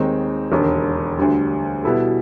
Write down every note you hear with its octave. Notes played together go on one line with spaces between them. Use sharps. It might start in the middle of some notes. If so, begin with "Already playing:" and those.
Already playing: D#2 D#3 G#3 C4 D#4
E1 D#2 D3
D2 D3 G3
B2 G3 B3 E4 A4